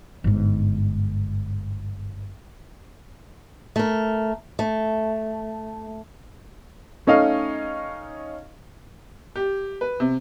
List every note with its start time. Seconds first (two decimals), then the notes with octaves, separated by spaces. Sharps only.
0.24 G1 G#2
3.76 A3 A#4
4.59 A3
7.07 A3 C#4 D#4 D#5 F5
9.36 G4
9.81 B4
10.00 C3